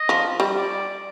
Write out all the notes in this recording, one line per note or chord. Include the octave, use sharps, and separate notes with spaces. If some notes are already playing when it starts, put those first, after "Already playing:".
Already playing: D#5
F3
G3
D5